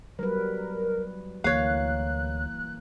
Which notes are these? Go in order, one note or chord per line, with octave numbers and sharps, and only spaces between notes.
F#3 G3 A#4 B4
D2 E3 A#3 C#5 F5 F#6